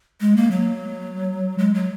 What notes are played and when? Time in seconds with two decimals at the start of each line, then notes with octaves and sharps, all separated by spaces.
0.21 G#3
0.36 A#3
0.51 F#3
1.58 G#3
1.74 F#3